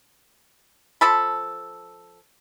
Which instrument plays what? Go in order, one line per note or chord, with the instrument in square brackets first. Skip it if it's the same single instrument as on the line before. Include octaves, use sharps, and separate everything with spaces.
[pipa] F3 A4 B5